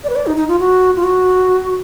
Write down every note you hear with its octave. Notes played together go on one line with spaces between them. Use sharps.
D5
B4
D5
D#4
D#4
F4
F#4
F4
F#4